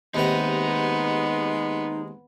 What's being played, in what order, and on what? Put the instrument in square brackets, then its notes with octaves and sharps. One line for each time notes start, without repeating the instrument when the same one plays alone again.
[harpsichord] D#2 C3 G5 [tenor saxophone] G#3 [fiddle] B3 [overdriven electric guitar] D#4